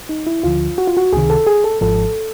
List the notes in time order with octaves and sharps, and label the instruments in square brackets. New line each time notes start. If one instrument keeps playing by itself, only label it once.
[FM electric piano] D#4
E4
D2 D3 F3 F4
F#4
F4
F#4
C#2 C3 D#3 G#4
A4
G#4
A4
G#1 G#2 F3 A4